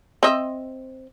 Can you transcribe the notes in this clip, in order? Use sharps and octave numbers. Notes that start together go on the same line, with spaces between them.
C4 D#5 E5